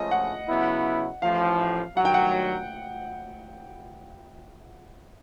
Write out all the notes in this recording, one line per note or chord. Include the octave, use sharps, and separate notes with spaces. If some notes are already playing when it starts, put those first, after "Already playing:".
Already playing: C#2 C#3 F3 A3 C#4 D#5
F#5
C#3 F#3 B3 E4
A1 A2 F3 F5
G2 D#3 F#3 F#5
G5
F#5